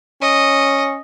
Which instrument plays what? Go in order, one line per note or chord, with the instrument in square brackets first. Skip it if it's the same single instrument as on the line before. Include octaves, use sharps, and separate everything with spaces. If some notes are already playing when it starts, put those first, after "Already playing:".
[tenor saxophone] C#4 [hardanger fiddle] D#5